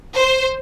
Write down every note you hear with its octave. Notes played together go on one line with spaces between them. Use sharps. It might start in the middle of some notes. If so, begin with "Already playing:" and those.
C5